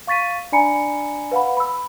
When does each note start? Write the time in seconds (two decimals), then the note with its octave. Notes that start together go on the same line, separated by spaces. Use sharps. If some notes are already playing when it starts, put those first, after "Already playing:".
0.07 F5 C#6 A6 B6 D#7
0.52 D4 D5 G#5 A#5 B5 C#7
1.31 B4 F5 F#5 B5
1.57 B5 E6